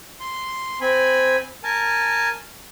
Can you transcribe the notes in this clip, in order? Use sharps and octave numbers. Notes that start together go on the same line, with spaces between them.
C6
C4 G#5 B5
A#4 G#5 A5